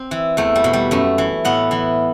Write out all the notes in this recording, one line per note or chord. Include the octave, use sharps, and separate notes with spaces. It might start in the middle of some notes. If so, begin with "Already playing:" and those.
Already playing: C4
E3
E2 A3
G3
B2
G3
F#2 A3
E3
A2 B3
E3